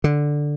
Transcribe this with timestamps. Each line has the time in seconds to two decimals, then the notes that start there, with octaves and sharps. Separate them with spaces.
0.04 D3